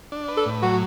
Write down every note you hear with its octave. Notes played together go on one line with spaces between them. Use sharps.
D4
B4
A4
A2
F#3 F#4